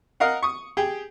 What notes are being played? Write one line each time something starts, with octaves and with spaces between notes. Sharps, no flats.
A#4 D#5 F5 F#5
C#6 D#6
G4 G#4 G5